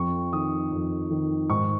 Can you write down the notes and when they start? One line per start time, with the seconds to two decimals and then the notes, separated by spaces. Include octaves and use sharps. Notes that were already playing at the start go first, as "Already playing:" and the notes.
Already playing: F2 C#6
0.33 D#3 D#6
0.72 F2
1.11 D#3
1.50 G#2 C#6